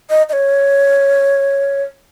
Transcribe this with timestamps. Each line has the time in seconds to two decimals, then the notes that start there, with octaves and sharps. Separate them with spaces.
0.10 D#5
0.29 D#5
0.33 C#5